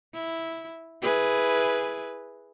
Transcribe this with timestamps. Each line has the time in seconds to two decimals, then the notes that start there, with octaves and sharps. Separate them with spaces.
0.14 E4
1.02 E4 G#4 B4